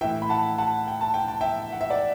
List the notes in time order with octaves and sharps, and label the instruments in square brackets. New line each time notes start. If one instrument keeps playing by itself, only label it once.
[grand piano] A2 E3 E5 G5
B5
F#5 A5
F#5 A5
G5
A5
G5
A5
E5 G5
F#5
E5
D5 F#5